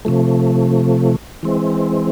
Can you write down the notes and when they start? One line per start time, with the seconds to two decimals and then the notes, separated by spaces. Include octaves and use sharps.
0.05 C3 F3 A3
1.43 E3 G#3 C4